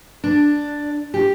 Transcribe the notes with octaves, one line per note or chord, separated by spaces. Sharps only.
D4
G4